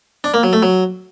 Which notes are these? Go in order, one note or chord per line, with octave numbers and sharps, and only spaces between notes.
D4
A#3
F#3
A3
F#3